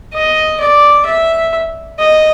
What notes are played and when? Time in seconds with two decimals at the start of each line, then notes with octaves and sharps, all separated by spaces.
0.14 D#5
0.60 D5
1.05 E5
1.99 D#5